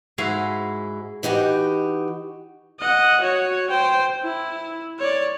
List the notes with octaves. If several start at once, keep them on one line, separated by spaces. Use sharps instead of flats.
G#2 G#3 E4 F#4 F5 G#5
E3 D#4 F#4 G4
D#5 F#5
F#4 C#5
C5 G5
E4
C#5 D5